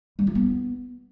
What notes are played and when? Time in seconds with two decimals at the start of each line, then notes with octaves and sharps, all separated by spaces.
0.19 G3
0.27 F4
0.35 B3